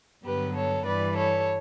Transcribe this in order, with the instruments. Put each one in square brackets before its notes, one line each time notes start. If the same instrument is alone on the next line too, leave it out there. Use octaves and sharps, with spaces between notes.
[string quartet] G2 D3 F#3 B3 G4 B4
A4 C#5
G2 E3 G3 B4 D5
A4 C#5